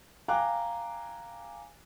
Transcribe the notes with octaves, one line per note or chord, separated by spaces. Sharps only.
F5 G5 G#5 A#5 D6 F#6